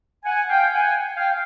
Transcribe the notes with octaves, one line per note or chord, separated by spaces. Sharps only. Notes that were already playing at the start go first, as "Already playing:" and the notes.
F#5 G#5
F5 G5
F#5 G#5
F5 G5